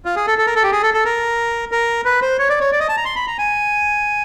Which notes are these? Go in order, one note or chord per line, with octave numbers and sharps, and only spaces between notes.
F4
G#4
A4
A4
A#4
A4
G4
G#4
A4
A4
A#4
A#4
B4
C5
C#5
D5
C#5
D5
D#5
A5
A#5
C6
B5
A#5
G#5